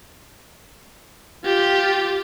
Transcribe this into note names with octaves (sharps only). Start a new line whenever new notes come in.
F4 G4